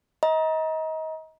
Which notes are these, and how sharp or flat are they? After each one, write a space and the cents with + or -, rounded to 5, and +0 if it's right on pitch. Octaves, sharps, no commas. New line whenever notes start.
D#5 +30 A#5 +25